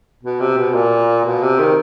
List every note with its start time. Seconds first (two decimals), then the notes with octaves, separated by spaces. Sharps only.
0.23 B2
0.40 C3
0.58 B2
0.74 A#2
1.25 B2
1.42 C3
1.59 D#3